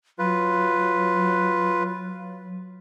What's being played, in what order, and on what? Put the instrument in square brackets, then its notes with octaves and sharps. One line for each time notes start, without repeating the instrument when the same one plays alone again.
[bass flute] F#3 [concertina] F4 B4